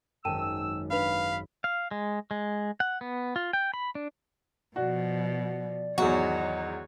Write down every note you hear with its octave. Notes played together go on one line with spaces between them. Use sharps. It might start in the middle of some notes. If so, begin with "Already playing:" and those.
G#1 F#2 G5 A5 E6 D#7
D4 B4 F5 B5 F7
F5
G#3
G#3
F#5
B3
F4
G5
B5
D4
B2 F3 F#4 D5
E2 G#2 D#3 F#3 F#4 C#5 D#5